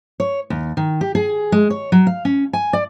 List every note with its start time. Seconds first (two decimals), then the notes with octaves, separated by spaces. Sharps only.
0.20 C#5
0.50 D#2
0.77 D#3
1.01 G4
1.15 G#4
1.52 G#3
1.70 C#5
1.92 F#3
2.07 F5
2.25 C#4
2.53 G#5
2.73 D5